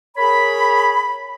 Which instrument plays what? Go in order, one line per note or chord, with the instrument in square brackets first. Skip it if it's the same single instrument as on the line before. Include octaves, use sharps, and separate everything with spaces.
[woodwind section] G#4 A#4 C#5 B5